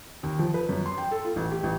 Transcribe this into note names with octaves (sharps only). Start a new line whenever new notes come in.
D#2
F3
B4
F#2
C6
G5
A4
F4
A1
G4
A1